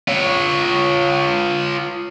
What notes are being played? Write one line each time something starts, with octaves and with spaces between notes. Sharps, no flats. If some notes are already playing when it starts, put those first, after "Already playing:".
F4 C#5